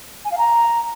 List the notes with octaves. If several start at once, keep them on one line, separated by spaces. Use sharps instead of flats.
G#5
F5
A#5